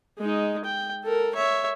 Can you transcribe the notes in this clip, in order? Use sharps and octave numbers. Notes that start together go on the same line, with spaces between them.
G#3 D#4
G5
A4 A#4
C#5 E5